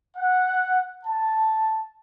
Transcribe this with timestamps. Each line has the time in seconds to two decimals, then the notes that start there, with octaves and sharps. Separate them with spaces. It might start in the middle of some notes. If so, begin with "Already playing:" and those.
0.16 F#5
1.03 A5